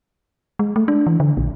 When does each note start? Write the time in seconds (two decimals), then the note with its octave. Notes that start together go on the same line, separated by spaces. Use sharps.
0.59 G#3
0.76 A3
0.88 D4
1.07 E3
1.20 D3
1.37 A#1